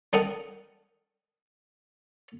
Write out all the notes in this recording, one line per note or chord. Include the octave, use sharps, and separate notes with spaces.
G3 D#4 A4 A#4 F#5 D#6